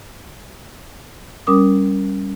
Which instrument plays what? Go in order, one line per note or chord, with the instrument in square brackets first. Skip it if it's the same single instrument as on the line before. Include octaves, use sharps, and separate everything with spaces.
[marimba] G3 C#4 A#4 D6 D#6